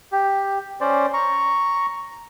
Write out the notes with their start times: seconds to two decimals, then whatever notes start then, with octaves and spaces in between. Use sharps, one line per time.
0.12 G4
0.81 C#4 C5 D5
1.14 A#5 C#6